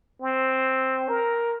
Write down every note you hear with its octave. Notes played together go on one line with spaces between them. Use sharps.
C4
A#4